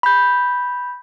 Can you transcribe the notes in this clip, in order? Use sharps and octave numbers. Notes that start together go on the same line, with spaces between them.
B5 G6